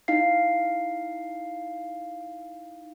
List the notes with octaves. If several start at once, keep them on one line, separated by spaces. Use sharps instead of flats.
D#4 E4 F5 C7